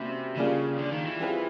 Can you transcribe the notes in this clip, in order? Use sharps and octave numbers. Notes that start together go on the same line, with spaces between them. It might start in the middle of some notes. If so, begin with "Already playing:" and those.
Already playing: C3 G3 A#3 C#4 F#4 B4
C#3 G3 A#3 D4 F4 G#4
D3
D#3
E3
G3 C4 F4 G#4 B4